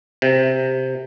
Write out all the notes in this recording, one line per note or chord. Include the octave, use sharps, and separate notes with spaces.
C3